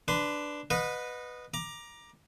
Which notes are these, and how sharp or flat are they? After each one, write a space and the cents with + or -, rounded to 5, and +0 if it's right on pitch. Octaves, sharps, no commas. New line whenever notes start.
D4 +0 B4 +0 C6 -20
B4 +0 D#5 -15 F#5 -40
A#5 +20 D6 +15